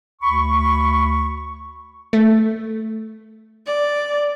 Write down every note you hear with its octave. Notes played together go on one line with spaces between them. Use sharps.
D2 B5 C#6
A3
D5